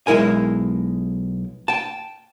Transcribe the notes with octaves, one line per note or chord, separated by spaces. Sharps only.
B1 G#3 E4 A#4 G#5
G5 A5